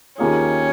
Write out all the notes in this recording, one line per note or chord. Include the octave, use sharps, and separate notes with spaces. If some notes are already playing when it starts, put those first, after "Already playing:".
D#2 D#3 A#3 C#4 F4 G#4